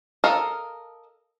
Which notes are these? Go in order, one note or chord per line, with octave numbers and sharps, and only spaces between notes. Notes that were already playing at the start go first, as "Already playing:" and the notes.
A4 A#4 D#5 F5